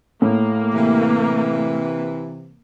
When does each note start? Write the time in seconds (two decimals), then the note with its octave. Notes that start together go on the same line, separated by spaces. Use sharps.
0.22 A2 A#3
0.72 C3 E3